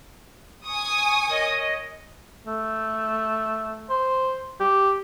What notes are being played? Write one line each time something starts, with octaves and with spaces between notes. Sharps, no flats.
G#5 C#6 D#6
A#4 C#5 D#5
A3
C5
G4